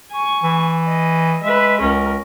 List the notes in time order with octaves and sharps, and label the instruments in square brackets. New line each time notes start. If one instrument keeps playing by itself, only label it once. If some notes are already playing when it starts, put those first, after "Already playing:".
[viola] G#5 C#6
[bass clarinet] E3
[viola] D#5
[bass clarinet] G#3 [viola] B4 E5
[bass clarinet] C#2 [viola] C#4 A#4